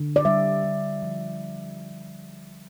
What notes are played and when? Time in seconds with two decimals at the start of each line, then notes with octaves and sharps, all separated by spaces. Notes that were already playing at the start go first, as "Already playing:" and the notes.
Already playing: D3
0.16 D5
0.25 G3 E5
0.64 G3
1.02 F3